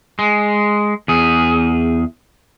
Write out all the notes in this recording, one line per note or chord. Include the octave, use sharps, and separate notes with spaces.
G#3
E2 G#4